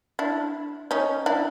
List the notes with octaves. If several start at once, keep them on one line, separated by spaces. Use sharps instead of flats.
D4 E4
C#4 D#4
D4 E4